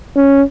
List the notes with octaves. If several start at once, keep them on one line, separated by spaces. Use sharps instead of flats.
C#4